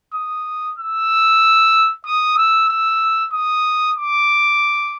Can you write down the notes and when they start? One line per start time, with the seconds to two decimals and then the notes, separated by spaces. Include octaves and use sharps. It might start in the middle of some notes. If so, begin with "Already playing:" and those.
0.14 D#6
0.79 E6
2.05 D#6
2.37 E6
2.69 E6
3.34 D#6
3.98 D6